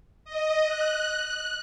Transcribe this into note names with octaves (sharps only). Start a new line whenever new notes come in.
D#5
F#6